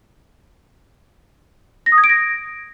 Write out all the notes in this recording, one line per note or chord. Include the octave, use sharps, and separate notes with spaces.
A#6
D#6
G#6
D7
A#6